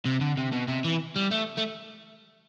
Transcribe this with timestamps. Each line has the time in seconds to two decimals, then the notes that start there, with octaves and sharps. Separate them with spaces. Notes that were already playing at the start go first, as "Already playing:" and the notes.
0.06 C3
0.21 D3
0.37 C3
0.52 B2
0.68 C3
0.84 E3
1.16 G3
1.31 A3
1.57 A3